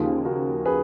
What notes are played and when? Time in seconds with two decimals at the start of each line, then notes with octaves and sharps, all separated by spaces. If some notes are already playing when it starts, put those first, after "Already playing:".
Already playing: D#2 C#3 F3 A#3 D#4 F4 G#4
0.25 F#4 A#4
0.66 G#4 B4